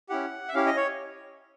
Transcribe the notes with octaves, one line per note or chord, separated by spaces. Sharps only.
C#4 E4 G4 F#5
E5
C#4 E4 G4 F5
D#5
C#5